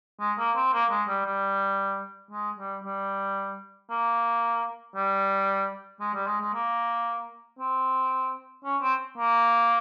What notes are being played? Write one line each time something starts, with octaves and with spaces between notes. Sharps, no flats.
G#3
A#3
C4
A#3
G#3
G3
G3
G#3
G3
G3
A#3
G3
G#3
G3
G#3
G#3
A#3
C4
C#4
C4
A#3